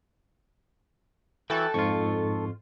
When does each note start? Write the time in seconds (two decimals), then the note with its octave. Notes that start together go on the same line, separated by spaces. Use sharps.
1.50 E3 E4 F#4 A4 G5 F#6 A6
1.74 F2 G#2 F4 C#6